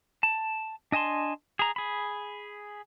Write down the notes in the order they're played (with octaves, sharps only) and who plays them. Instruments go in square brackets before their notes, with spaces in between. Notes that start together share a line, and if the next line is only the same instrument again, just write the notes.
[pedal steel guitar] A5
D4 D#5 G#5 A5 C6
G#4 A#5
G#4 B5